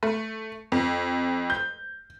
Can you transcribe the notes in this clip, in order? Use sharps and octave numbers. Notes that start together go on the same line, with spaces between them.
A3
F2
G6